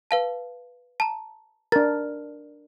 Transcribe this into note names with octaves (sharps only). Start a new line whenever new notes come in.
B4 F5 A5
A5 A#5
D4 A#4 A6